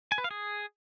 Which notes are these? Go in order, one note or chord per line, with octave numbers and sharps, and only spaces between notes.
G#5
B4
F5
G#4